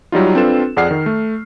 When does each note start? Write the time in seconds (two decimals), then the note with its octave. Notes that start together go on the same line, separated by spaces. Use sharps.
0.12 F#3 G3 D#4 F4
0.35 C4 D4 F4 A4 B4 E7
0.77 F2 G#4 D5 F#5 F6 C7
0.91 D#3
1.06 A3